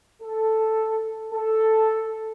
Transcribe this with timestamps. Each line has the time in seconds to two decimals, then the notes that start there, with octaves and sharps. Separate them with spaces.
0.22 A4
1.32 A4